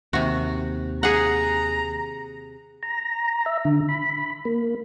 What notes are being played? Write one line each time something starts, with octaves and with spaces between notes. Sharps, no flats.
D#2 C3 F#4
G#4 F#5 A#5
A#5
E5
D3
B5
A#3